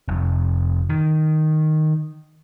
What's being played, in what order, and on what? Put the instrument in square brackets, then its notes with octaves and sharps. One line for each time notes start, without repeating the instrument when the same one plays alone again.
[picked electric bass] F1
D#3